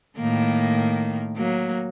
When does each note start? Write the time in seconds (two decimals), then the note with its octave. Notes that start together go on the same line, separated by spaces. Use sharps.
0.18 A2 D#3 A#3
1.36 F#3 A#3